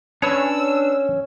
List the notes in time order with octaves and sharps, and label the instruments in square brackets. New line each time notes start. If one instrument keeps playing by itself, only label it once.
[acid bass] C#4 [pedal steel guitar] D4 B4 [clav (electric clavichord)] C#5 [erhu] E6